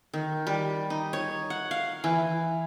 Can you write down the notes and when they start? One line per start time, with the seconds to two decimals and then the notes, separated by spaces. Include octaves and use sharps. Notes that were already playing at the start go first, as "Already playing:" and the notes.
0.14 D#3
0.47 G3
0.90 D#4
1.13 C#5
1.50 F#5
1.71 F5
2.04 E3